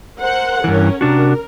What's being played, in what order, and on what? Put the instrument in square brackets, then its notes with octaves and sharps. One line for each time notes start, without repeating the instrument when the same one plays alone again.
[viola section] A#4 C5 F#5
[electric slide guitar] G2 E3 [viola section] C#4 A#4
[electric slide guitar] C3 D4 F#4 [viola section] A#4